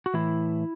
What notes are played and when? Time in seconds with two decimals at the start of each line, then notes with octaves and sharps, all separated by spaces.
0.06 F#4
0.14 A2 E3 E4